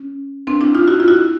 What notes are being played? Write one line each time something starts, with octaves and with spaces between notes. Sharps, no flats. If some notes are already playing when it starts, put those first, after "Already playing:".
Already playing: C#4
C4 D4
D4 E4
D#4 F4
E4 F#4
F4
E4 F#4